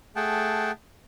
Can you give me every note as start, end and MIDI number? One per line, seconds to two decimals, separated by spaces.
0.16 0.71 57
0.16 0.71 68
0.16 0.71 78
0.16 0.71 79
0.16 0.71 81